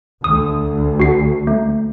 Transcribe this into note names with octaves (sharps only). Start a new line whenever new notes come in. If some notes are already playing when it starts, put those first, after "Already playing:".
D2 D#6
F#4 C7
A3